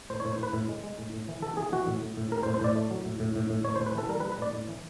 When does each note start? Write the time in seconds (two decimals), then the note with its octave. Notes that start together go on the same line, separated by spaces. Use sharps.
0.10 A2 C5
0.20 C#5
0.25 A2
0.32 C5
0.39 A2 B4
0.53 A2
0.69 G#3
0.83 G#3
0.99 A2
1.13 A2
1.28 E3
1.42 E3 A4
1.57 E3 G#4
1.72 E3 F#4
1.87 A2
2.02 A2
2.17 A2
2.31 A2 A#4
2.43 C5
2.46 A2
2.54 C5
2.61 A2 D5
2.75 A3
2.91 F#3
3.05 A2
3.20 A2
3.36 A2
3.50 A2
3.64 A2 C#5
3.76 C5
3.80 A2
3.86 B4
3.95 E3 A4
4.09 G3 A#4
4.20 B4
4.24 G3
4.32 B4
4.38 A2 D5
4.53 A2
4.69 E3